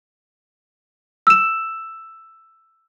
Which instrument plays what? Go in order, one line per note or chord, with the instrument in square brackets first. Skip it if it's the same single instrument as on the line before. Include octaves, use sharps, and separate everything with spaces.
[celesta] E6 E7